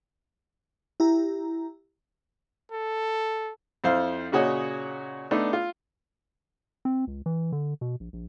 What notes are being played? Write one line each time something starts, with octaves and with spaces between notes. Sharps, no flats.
E4 G4 A#5
A4
F2 E4 C5 F5
A#2 C#3 F#4 C#5 D#5
A3 B3 D4 D#4
F4
C4
C#2
E3
D3
B2
A#1
A#1